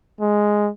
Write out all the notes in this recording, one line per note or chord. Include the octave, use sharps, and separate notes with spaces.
G#3